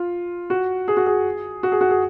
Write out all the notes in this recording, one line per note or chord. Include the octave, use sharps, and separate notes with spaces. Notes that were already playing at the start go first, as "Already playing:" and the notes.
Already playing: F4
F#4
G#4
F#4
G#4
F#4
G#4
F#4
G#4